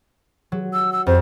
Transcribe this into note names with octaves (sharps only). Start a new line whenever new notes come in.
F#3
E6
E6
F2 C5